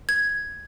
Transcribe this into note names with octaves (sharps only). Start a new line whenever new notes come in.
G#6